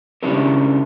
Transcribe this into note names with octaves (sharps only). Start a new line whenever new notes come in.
C#3 C#4 D4 E4 G4 A#4